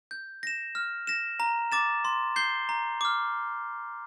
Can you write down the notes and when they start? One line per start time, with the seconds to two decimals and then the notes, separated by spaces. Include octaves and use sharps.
0.11 G6
0.43 A#6 E7
0.75 F6
1.07 A#6 E7
1.40 A#5
1.72 D6 A6 E7
2.05 C6
2.36 G6 C7 G7
2.69 A#5
3.01 D6 F6